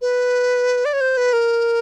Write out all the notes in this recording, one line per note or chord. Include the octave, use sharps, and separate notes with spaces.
B4
D5
C#5
C5
B4
A#4